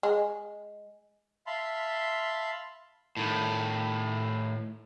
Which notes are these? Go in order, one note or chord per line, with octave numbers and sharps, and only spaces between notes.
G#3
E5 F5 A5 B5 C6
A2 D#3